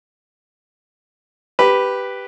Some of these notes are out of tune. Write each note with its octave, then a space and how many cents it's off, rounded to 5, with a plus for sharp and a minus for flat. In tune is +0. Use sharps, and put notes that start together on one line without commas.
G4 +0 B4 +0